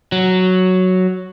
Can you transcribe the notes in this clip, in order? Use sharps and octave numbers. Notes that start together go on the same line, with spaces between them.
F#3